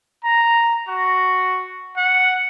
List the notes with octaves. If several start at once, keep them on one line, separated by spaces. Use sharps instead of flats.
A#5
F#4
F#5